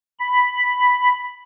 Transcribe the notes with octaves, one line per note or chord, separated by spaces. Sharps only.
B5